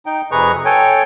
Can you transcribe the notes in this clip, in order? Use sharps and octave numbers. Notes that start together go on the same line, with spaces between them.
D#4 G5
F2 C3 G#4 B4 A#5 C#6
A4 C#5 G5 G#5